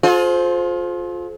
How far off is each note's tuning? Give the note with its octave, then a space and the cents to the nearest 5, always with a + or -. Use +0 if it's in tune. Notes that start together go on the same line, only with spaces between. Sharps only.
F4 +25 A4 -45 C5 +0